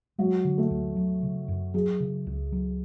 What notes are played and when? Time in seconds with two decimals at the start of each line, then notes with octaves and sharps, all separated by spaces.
0.18 F#3 G#3
0.45 D3
0.58 A3
0.70 D2
0.96 F#3
1.23 C#3
1.48 F#2
1.74 F#3 G#4
2.00 C#3
2.26 C#2
2.52 F#3